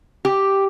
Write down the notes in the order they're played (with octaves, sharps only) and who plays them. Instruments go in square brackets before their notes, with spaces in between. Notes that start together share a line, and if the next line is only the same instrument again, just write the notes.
[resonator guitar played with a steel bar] G4